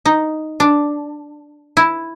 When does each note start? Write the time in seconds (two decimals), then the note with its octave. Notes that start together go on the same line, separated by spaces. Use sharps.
0.05 D#4
0.60 D4
1.77 E4